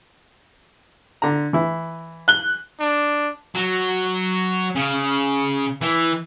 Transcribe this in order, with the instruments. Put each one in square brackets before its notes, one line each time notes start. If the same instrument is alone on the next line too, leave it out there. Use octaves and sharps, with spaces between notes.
[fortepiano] D3 A#5
E3 E4
[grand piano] F#6 G7
[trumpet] D4
[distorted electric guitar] F#3
C#3
E3